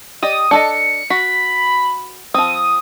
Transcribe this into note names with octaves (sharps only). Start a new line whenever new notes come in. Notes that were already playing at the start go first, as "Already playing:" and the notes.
G4 D5 D#5 D#6
D4 A4 D#5 C#7
F#4 B5
F3 C4 D#6